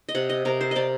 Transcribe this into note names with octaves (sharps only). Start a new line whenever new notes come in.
D#5
C3 F#5
D#5
C3 A#4
C5
C3 D5 D#5